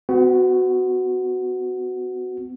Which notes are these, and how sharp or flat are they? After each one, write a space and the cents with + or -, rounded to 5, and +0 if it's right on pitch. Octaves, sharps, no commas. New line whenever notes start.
B3 +45 F#4 +0